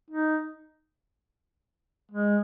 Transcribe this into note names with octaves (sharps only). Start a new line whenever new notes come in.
D#4
G#3